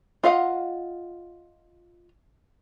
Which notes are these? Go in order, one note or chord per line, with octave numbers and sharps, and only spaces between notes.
F4 D#5 F5 F#5